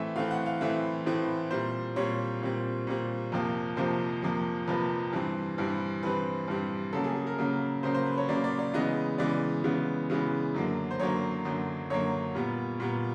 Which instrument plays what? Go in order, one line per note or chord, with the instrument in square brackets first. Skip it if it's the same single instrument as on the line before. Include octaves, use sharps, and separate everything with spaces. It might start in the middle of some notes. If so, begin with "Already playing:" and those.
Already playing: [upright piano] A2 E3 A3 C4 E5 G#5
A2 E3 A3 C4 F5
F#5
F5
A2 E3 A3 C4 E5
A2 E3 A3 C4
A#2 G3 C4 C5
A#2 G3 C4 C#5
A#2 G3 C4
A#2 G3 C4
F2 C3 F3 A#3
F2 C3 F3 A#3 C5
F2 C3 F3 A#3
F2 C3 F3 A#3 B4
G2 E3 G3 C4
G2 E3 G3 C4
G2 E3 G3 C4 B4
G2 E3 G3 C4
C#3 F#3 A#3 A4
G#4
G#4
A#4
C#3 F#3 A#3
C#3 F#3 A#3 C5
C5
B4
C#5
C#3 F#3 A#3 D5
D5
D5
C#3 E3 G#3 B3 D#5
C#3 E3 G#3 B3 D5
C#3 E3 G#3 B3
C#3 E3 G#3 B3
F#2 D3 F#3 A#3
C5
F#2 D3 F#3 A#3 C#5
F#2 D3 F#3 A#3
F#2 D3 F#3 A#3 C#5
A#2 G3 B3
A#2 G3 B3